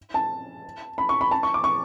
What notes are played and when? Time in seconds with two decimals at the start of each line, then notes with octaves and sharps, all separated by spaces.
0.14 A5
0.98 B5
1.09 C#6
1.21 B5
1.31 A5
1.43 C#6
1.54 D6
1.64 C#6